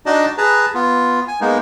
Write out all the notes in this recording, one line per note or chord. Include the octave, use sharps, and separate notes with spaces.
D4 D#4 F#4 D5 D#5 A5
G#4 B4 A5 A#5
B3 F4
G#5
G#3 A#3 B3 D#4